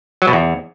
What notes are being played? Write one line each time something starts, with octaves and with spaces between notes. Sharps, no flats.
F#3
B2
E2